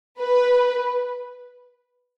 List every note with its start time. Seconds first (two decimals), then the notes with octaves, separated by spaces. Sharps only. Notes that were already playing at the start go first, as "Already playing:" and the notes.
0.20 B4